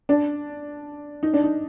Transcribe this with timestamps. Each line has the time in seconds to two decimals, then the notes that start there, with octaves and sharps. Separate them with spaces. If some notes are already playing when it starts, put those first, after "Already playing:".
0.09 D4
1.23 D#4
1.34 D4
1.44 D#4